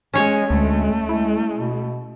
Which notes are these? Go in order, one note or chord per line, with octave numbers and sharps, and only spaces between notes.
G#3 C#4 C#5
D2 G#3 A3
G#3 E4
B2